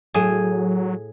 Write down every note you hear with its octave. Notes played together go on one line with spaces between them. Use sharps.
A2 F#3 G#4